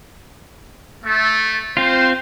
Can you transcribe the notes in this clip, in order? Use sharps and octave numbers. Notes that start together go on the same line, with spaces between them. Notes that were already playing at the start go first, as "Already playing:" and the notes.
A3
C4 F4 C5